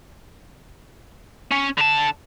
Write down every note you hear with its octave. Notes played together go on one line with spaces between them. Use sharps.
C#4
D3 A5